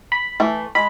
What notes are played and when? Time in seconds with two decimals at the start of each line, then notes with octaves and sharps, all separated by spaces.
0.12 B5
0.40 E3 A3
0.75 G#3 B5